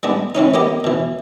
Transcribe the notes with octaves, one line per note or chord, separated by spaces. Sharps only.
G3 G#3 B3 D4
E3 C4 C#4 D#4
A#3 B3 G4 D#5
B2 E3